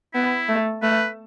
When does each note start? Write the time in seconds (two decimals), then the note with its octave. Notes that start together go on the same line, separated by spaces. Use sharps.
0.14 B3 E4
0.49 A3
0.83 A3 B4